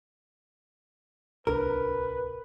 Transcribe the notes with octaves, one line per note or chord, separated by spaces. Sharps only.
D1 C2 D4 A#4 B4